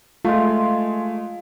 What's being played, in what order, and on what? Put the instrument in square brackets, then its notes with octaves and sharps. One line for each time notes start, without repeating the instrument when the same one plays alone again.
[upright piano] G#3 A3 [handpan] F4